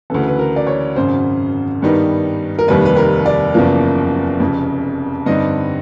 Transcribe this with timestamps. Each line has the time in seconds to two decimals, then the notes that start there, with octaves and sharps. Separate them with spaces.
0.10 D2 C#3 E3 A4
0.28 B4
0.39 A#4
0.56 D5
0.67 C#5
0.96 G#1 F#2 C#3 C5
1.82 G2 D#3 G3 B3 D#4
2.59 A#4
2.68 F1 D#2 D#3 G3 B4
2.85 B4
2.96 A#4
3.26 D5
3.54 F#1 E2 C#3 F3 A#3
4.40 F1 F2 C#3
5.26 G2 D3 G3 C4 D#4 D#5